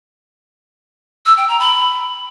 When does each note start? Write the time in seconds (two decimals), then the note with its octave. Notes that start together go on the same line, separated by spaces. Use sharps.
1.26 E6
1.37 G5
1.48 A#5
1.59 B5